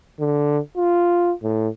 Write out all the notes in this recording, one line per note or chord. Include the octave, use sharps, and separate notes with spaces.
D3
F4
A2